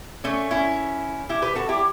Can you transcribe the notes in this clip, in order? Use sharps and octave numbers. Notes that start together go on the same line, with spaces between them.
A3 C#4
C#4 E4
E4 G4
G4 B4
F#4 A4
E4 G4